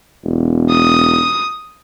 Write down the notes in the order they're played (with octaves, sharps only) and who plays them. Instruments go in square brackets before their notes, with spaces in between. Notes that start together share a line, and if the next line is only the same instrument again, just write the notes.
[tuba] E1
[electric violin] D#6